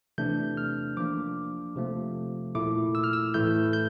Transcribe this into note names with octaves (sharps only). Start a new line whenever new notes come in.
C3 E3 A3 D4 G6
F6
F3 A#3 D4 D6
C3 F3 A3
A#2 A3 E4 D6
E6
F6
E6
A2 E3 A3 E4 G6
G6